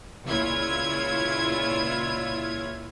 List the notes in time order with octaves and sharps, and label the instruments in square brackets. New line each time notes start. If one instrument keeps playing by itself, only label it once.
[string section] C#2 A#2 E4 F4 C#5 G#6